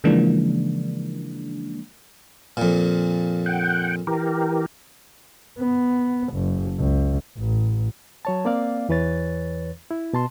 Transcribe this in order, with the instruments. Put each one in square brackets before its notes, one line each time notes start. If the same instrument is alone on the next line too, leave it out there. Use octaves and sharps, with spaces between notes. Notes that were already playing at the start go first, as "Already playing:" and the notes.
[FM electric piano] C#3 E3 F3 G#3 A#3 D4
[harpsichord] F2 A#2
[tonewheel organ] F#5 G5
E3 G4 A#4
[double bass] B3
F#1
C#2
A1
[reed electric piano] F#3 C#5 A5
A#3 C4 D5 F5
E2 E3 B4 C#5 A6
E4
B2 A5 C6